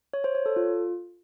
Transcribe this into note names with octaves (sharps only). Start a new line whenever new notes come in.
C#5
C5
C#5
A4
F4